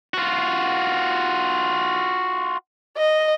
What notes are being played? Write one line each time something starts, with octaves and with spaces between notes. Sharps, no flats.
F4 F#4
D#5